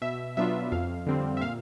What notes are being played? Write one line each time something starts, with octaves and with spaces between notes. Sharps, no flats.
B2 E5
F#3 B3 D4 F4 E5
F2 F5
D3 G3 C4
E5
A#2 F5